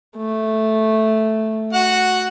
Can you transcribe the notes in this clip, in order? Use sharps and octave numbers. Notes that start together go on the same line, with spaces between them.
A3
F#4 F#5